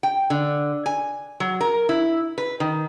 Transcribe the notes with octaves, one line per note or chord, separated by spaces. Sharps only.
G5
D3
G#5
F#3
A#4
E4
B4
D#3